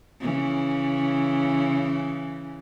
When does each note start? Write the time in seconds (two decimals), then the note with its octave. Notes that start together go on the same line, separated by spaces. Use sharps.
0.20 C#3 E3